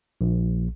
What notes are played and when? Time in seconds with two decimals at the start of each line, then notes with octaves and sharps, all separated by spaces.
0.21 A#1